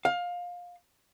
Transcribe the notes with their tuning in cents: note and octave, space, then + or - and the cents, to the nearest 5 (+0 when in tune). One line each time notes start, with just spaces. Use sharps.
F5 +20